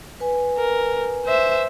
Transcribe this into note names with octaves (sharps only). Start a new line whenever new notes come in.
B4 G#5
A#4
C5 E5